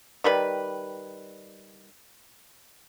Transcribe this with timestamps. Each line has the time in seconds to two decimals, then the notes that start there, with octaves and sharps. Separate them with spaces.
0.24 D#3 G3 B4